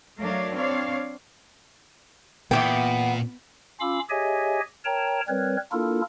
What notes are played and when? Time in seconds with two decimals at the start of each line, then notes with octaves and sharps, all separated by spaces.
0.21 F#3 A3 D4 A#4 C#5 F5
0.53 C4 D4 C#5 F5
2.51 E2 A#2 E3 B3 G5
3.80 C#4 F4 F5 B5 D6 E6
4.10 G4 G#4 C#5 D#5 E5 G#5
4.85 A#4 C#5 G5 A5 A#5
5.28 G3 C4 A#4 B4 C#5
5.72 A#3 D4 E4 F4 A4 A#4